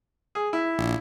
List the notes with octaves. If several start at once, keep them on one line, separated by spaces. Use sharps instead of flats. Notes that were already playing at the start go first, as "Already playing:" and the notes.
G#4
E4
A#1